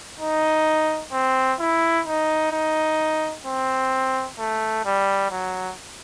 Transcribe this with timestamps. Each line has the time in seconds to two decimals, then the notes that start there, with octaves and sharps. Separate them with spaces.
0.20 D#4
1.12 C4
1.60 E4
2.06 D#4
2.52 D#4
3.45 C4
4.39 A3
4.85 G3
5.31 F#3